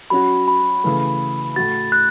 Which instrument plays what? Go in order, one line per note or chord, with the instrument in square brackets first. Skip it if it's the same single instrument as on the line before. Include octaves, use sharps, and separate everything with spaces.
[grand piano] F#3 C#4 F#4 [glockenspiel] B5
[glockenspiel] B5
[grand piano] C#3 E3 A3
[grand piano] A2 A3 F#4 [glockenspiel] A6
[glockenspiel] F#6